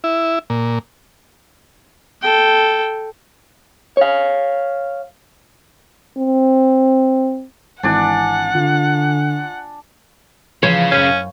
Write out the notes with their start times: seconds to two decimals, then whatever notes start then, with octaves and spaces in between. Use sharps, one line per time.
0.04 E4
0.50 A#2
2.22 A4 G5
3.97 C#5 F5
6.18 C4
7.83 G#1 E3 D4 D5 F#5 G#5
8.55 D3 F4
10.63 C#3 E3 F3 C#5
10.92 F#2 C#4 C5 F5